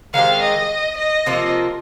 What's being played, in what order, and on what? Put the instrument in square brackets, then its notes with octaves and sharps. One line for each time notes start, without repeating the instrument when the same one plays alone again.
[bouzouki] D#3 G#3 C4 G4 [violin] F5
[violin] D#5
D#5
[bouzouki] C3 F3 A#3 F4